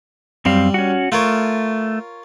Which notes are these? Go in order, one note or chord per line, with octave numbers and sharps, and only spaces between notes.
F#2 G3 C4 F5
C#4 F#4
A3 F4 A#4 C#5